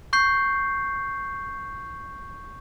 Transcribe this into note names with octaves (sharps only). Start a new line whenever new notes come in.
C#6 G6 C7